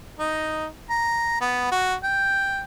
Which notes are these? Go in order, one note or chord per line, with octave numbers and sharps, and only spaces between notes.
D#4
A#5
B3
F#4
G5